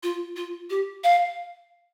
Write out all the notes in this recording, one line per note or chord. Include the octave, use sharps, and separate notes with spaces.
F4
F4
G4
F5